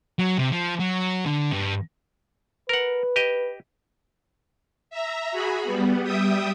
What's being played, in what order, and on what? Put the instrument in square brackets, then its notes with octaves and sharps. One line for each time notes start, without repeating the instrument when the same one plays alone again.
[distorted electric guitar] F#3
C3
F3
F#3
D3
G2
[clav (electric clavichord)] A#4 F#5 [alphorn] B4
[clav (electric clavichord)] G4 D#5
[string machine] E5 A#5
F#4 G#4 B5
G3 B3
G3 E5 G5 D#6